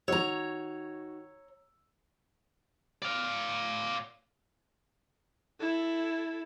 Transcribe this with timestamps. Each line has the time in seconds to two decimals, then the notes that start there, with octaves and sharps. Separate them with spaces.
0.08 D#3 F#4 C#5 A#5 E6
3.02 D5 F5
5.60 E4 A4